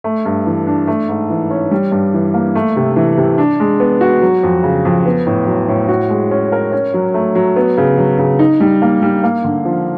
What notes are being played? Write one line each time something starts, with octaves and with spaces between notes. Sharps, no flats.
A3
G2
E3
D4
A3
G#2
E3
C#4
G3
G2
E3
A#3
A3
C3
E3
C3
D4
G#3
B3
F#4
F#3
F2
C#3
F2
B3
A2
F#3
A2
F#4
G#3
C#4
A#4
C#4
F#3
A3
F#3
B3
C#3
F#3
C#3
D#4
G3
A#3
G3
A#3
D3
F3